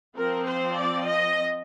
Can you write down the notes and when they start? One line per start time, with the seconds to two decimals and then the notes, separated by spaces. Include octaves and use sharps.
0.16 F3 C4 A#4
0.46 C5
0.76 D5
1.04 D#5